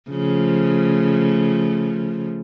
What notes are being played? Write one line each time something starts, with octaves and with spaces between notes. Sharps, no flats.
C#3 F3 A3